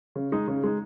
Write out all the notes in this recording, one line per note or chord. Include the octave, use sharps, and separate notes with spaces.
C#3
G#3 D#4
C#3
G#3 D#4